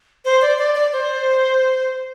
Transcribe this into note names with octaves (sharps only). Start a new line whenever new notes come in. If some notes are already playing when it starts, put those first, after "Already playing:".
C5
D5
D5
D5
C5